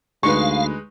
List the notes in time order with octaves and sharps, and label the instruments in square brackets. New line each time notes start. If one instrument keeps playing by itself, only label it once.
[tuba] D2 [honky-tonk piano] G#3 D#4 B4 [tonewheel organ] F5 [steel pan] C#6